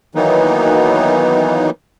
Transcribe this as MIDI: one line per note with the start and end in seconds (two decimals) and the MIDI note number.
0.15 1.70 51
0.15 1.70 52
0.15 1.70 54
0.15 1.70 58
0.15 1.70 59
0.15 1.70 63